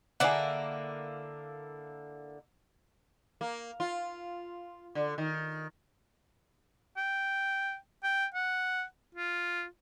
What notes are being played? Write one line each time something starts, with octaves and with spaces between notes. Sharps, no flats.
D3 A#3 E4 G#4 D5 F#5
A#3
F4
D3
D#3
G5
G5
F#5
F4